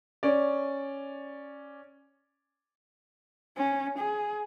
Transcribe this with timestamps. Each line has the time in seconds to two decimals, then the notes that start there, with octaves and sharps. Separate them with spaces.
0.23 C#4 D5
3.58 C#4
3.99 G#4